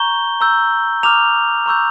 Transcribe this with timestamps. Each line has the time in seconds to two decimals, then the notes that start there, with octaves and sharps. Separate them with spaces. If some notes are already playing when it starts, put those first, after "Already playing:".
Already playing: A#5 C#6 G6 G7
0.41 A#5 E6 G6
1.03 A#5 D6 F6 F7
1.66 A#5 C#6 E6 G6